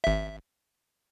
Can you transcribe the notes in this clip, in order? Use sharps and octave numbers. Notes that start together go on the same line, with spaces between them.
G#1 E5